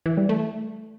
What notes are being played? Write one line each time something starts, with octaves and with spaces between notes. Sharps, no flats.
E3
G3
A3